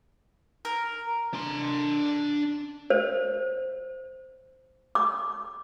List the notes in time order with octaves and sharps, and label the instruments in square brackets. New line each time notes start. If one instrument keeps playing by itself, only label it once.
[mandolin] A#4
[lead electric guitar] D4 C6
[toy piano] C5
D6